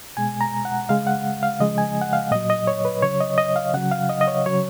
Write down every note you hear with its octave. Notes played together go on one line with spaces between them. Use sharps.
B2 G#3 G#5
A#5
F#5
C#3 G#3 F5
F#5
F5
C#3 F3 G#3 D#5
G#5
F#5
F5
A#2 F#3 D#5
D#5
C#5
B4
C#3 F#3 C#5
D#5
D#5
F5
C#3 F#3 F#5
F5
D#5
D#5
C#5
C#3 F#3 C#5